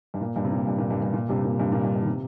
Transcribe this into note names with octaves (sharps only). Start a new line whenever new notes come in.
G2
A#2
G2
C3
A#2
G2
A#2
G2
G2
A#2
G2 C3
A#2
G2 C3
A#2
G2
G2
D#3
C3